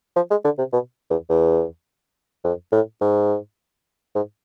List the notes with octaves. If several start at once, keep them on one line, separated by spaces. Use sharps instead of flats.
F3
G#3
D3
C3
B2
E2
E2
F2
A2
G#2
G#2